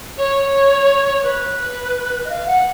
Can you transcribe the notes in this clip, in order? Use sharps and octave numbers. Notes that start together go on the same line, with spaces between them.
C#5
B4
D#5
F5
F#5